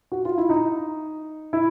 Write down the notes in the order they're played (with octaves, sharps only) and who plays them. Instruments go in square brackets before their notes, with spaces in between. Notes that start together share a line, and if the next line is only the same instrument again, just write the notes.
[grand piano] F#4
F4
E4
D#4
E4